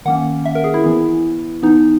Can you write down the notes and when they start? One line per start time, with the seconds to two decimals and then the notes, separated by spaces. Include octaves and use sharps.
0.05 D#3 A#3 C#4 F#5
0.46 E5
0.55 A#4
0.64 G#4
0.74 E4
0.84 E3 B3
1.63 E3 B3 D#4